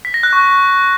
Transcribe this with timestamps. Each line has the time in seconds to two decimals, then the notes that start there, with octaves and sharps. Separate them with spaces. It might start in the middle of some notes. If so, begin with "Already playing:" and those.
0.05 B6
0.14 A#6
0.23 F#6
0.33 C#6